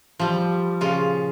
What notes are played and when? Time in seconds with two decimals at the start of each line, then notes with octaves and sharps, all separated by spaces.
0.19 F3 G3
0.81 A#2 C#3 F4